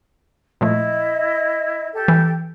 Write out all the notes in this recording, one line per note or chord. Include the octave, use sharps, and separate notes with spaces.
A#2 F3 A3 E4 D#5
G4 A4 G5
E3